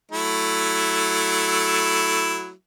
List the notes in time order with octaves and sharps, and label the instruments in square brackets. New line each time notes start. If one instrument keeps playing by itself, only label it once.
[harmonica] F#3 A3 E4